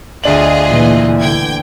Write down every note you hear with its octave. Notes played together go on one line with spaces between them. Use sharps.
D2 D4 F4 G#4 D#5 F#7
A#2 E3
D2 D3 E3 G5 G#6